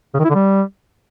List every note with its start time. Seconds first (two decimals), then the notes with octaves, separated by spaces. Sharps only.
0.14 C#3
0.19 D#3
0.25 E4
0.30 D3
0.35 G3